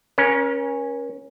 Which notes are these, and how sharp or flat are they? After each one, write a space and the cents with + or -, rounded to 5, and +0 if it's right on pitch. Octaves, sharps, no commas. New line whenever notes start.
C#4 -10 A#4 +40